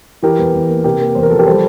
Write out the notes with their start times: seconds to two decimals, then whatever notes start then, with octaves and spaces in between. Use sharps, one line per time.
0.23 E3 G4 A#4
0.39 E2
0.54 E2
0.69 A#3
0.84 C3 G4 A#4
1.01 A#3
1.15 E2 C5
1.23 A#4
1.31 F3 A4
1.39 G4 A#4
1.47 G3 A4 C5